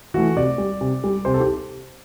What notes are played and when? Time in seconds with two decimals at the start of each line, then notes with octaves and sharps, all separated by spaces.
0.14 E3 A3 F#4
0.37 C3 D5
0.58 G3
0.81 C3
1.04 G3
1.25 C3 C5
1.34 A4
1.40 G4